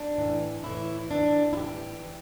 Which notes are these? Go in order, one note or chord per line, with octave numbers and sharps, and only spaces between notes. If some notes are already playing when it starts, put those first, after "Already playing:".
Already playing: D4
A2 E3
A2 E3 E4
A2 E3 D4
E4
A2 E3 G4
E3